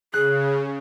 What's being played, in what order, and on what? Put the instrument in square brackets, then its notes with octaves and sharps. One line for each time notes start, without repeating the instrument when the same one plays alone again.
[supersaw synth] C#3 [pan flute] G#4 [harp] F#6